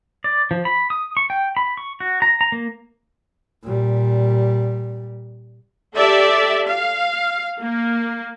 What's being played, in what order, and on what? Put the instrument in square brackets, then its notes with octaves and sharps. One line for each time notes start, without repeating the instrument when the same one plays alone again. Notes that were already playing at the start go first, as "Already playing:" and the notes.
[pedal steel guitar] D5
F3
B5
D#6
C#6
G5
B5
C#6
F#4
A#5
A#5
A#3
[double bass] A#2 G3
[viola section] G4 A4 D5 E5
F5
A#3